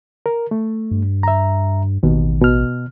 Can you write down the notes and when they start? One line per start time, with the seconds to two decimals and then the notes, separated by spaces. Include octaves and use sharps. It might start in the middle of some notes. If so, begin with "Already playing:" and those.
0.26 A#4
0.51 A3
0.91 G2
1.23 E5 A#5
2.03 A1 D#2 B2 D#3
2.41 B2 F6